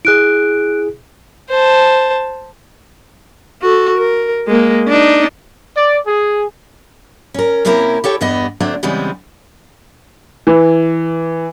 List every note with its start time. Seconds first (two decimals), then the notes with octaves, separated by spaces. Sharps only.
0.05 E4 G#4 F#6 D7
1.50 C5 A5
3.62 F#4 A4
3.98 A#4
4.48 G#3 A#3
4.88 D4 D#4
5.76 D5
6.07 G#4
7.34 C#4 A#4
7.65 C3 A#3 C4 C#4 E4 A#4
8.04 G4 A4 C#5 G5
8.21 E2 G2 B3 G4 D#5
8.60 D3 F#3 A3 C4 D4
8.83 C#3 E3 G3 G#3 B3 C4
10.47 E3